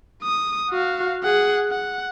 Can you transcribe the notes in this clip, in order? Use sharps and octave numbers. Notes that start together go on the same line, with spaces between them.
D#6
F#4 F5
G#4 F#5
F#5